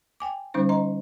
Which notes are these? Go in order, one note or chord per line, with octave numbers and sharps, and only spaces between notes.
G5 G#5 D6
D3 G3 C#4 D#4 C5
D#5 A#5 C6